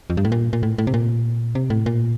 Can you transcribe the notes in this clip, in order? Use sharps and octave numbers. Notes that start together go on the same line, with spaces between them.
F2
G2
A2
A#2
A#2
A2
A2
C3
A#2
C3
A2
A#2